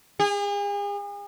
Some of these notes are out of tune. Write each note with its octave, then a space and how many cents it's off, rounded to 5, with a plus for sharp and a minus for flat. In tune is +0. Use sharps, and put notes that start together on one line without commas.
G#4 -40